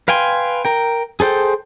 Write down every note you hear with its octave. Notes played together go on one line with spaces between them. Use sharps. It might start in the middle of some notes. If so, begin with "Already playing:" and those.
B4 F5 G5 G#5 C6
A#4 G5
G#4 A4 C5 G5